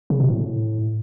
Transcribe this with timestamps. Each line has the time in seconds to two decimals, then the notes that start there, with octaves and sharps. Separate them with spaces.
0.10 C#3
0.20 B2
0.30 A2